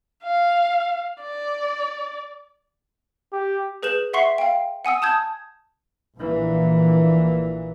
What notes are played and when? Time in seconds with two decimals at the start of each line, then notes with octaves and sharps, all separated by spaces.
0.24 F5
1.22 D5
3.33 G4
3.83 G#4 B4 G6 E7 F#7
4.13 E5 F#5 C6 C#6 C7
4.38 F5 G5
4.85 F#5 G#5 D#6 E6
5.02 A5 D#6 G6 G#6
6.17 A#1 A#2 E3